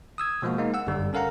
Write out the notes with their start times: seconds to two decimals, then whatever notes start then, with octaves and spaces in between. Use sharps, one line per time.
0.18 D#6 E6 G#6
0.42 B2 F3 G#3 A#3 F#4
0.58 G#3 A#3 D#4
0.74 F#5 E6
0.87 G1 F#2 D3 G3
1.13 C#4 A4 A#4 F5 F#5 A#5